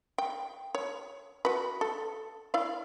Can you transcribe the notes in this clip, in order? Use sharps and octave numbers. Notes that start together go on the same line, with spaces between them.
G5
C#5
F#4 B4
A4
E4 D5 F5